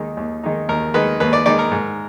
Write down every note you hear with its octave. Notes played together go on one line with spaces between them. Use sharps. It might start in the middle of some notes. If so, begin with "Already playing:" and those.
Already playing: D#2 D#3 G#3 D#4
D#2
D#3 G#3 D#4
D#2 A#4
D#3 G#3 D#4 B4
D#2 B4
D5
D#3 G#3 D#4 D5
A#4
G#2